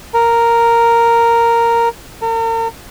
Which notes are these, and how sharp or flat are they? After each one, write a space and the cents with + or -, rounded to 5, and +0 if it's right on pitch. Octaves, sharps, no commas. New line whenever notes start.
A#4 -5
A#4 -40